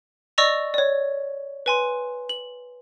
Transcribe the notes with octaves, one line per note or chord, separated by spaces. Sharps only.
D5 D#5 C#6 E6 A#6 F7
C#5 D5
B4 G#5 C6
F#7